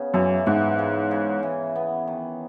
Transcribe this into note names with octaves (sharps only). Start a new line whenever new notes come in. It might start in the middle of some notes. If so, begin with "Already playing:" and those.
Already playing: C#3 B3
F#2 E3
G#2 B3
C#3
C#3
E3
B3
D#3